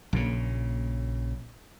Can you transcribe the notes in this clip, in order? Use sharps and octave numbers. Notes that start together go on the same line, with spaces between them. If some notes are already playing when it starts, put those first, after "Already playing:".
A#1 A#2 C#3